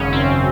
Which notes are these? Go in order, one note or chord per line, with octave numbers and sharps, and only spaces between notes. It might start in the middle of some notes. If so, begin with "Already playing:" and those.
Already playing: G#1 F#2 C#3 C#4
C4